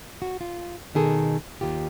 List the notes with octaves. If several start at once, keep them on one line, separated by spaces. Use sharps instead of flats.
F#4
F4
B2 D#3 G#4 A4
D#2 D#3 F4 G4